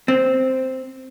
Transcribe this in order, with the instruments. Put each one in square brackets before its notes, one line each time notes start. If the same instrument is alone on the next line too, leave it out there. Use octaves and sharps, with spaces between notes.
[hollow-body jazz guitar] C4